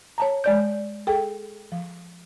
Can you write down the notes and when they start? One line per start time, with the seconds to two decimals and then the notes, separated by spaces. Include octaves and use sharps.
0.18 C#5 A5 A#5
0.44 G#3 D5 G6
1.07 G#4 A4 G5
1.72 F3